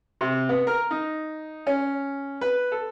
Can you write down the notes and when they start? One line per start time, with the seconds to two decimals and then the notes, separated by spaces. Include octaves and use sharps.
0.21 C3
0.49 B3
0.67 A#4
0.91 D#4
1.67 C#4
2.41 B4
2.72 A4